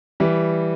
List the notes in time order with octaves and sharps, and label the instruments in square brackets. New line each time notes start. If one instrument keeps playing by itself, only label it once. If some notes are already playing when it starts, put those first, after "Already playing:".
[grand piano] E3 G3